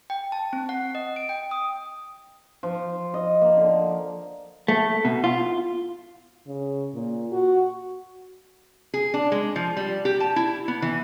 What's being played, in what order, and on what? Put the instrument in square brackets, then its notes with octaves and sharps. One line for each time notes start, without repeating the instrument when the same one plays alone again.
[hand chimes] G5
A5
C4
F#5
D#5
D7
G5
D#6
[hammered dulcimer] F3
D#5
A#3
D3
[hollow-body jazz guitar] A3
B2
F4
[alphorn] C#3
A#2
F#4
[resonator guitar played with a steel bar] G#4
D4
G#3
F3
G3
G4
A5
E4
B3
E3